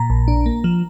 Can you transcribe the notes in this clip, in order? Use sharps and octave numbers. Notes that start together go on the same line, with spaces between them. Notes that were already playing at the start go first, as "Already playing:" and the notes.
Already playing: A#2 A#5
A#1
D4
A#3
F3